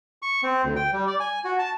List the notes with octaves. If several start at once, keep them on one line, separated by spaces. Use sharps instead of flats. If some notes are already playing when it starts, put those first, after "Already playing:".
C#6
C4
D2
G5
G3
D5
G#5
F#4
A5